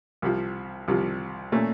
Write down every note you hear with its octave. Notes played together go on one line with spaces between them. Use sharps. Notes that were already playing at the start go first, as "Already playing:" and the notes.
C2 C3 F3
C2 C3 F3
A#2 A3 C#4